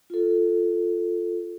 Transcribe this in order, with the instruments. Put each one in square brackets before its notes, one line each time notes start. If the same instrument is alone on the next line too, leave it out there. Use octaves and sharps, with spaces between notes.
[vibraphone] F4 A4